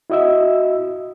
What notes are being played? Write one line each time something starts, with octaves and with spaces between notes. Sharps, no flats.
E4 F#4 D#5 E5 E6